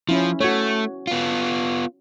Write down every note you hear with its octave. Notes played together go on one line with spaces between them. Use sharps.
F3 C#4 E4
A3 F#4 C#5
B3 F4